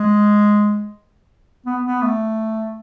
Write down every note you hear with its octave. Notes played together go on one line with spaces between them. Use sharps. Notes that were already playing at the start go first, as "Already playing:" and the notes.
Already playing: G#3
B3
B3
A3